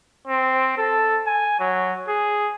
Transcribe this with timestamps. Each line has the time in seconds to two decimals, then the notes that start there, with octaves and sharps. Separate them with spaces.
0.28 C4
0.78 A4
1.27 G#5
1.60 F#3
2.08 G#4